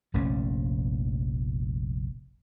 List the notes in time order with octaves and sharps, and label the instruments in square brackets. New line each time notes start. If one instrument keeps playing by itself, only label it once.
[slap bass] F1 A#1 A3 C#4